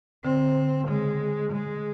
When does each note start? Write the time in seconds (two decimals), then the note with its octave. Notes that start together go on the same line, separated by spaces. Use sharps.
0.24 D3 C4
0.88 C#3 G#3
1.52 G#3